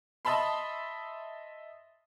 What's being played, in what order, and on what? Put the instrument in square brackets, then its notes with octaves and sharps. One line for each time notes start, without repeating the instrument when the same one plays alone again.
[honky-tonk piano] D#5 E5 A5 B5 C6